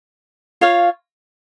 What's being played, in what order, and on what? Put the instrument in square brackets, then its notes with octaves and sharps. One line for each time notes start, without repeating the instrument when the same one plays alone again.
[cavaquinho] F4 C#5 F5